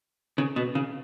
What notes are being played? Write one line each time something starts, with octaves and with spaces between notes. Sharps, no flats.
C#3
B2
C#3